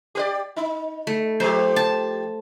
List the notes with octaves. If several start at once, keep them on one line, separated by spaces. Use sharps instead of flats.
G4 A#4 D5
D#4
A3
F3 G4 C5
A5